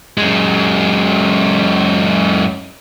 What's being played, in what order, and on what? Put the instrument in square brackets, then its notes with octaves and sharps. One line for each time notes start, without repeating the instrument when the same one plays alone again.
[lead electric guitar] F#2 G#3